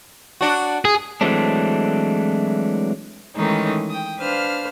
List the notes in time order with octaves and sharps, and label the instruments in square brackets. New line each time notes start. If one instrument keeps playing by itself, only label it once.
[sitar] D4 F#4
[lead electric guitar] G#4
[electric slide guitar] E3 F#3 G#3 A3 C4 D4
[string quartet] D#3 E3 G#3 A3 C#4 D#4
G5 D#6
D4 B4 C5 F5 F6